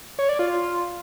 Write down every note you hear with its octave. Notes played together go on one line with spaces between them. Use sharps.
C#5
D5
F4